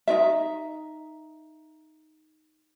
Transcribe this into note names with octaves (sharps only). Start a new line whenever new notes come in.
D#4 F4 E5